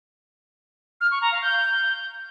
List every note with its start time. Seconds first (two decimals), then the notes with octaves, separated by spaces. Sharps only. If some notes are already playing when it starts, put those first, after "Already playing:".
1.01 F6
1.11 C#6
1.21 A#5
1.32 F5
1.42 G6